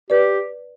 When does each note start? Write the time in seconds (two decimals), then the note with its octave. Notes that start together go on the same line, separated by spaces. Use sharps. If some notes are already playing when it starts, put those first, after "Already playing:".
0.10 G4 B4 D5